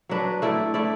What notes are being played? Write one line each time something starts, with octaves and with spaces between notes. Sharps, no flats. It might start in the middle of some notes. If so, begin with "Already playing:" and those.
F#3 D4 B4
A3 E4 D5
A3 E4 D5